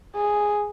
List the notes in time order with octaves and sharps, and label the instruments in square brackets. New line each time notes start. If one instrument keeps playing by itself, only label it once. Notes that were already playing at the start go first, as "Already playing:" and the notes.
[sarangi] G#4